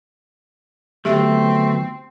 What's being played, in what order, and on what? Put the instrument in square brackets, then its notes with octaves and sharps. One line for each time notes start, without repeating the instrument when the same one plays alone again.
[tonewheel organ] D3 F#3 B3 [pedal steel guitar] A3 [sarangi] C4 [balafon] G4 E5 G5